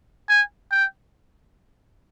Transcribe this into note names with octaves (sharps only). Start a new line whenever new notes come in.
G#5
G5